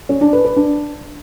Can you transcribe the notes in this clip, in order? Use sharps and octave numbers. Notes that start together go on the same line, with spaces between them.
C#4
D4
B4
B4
D4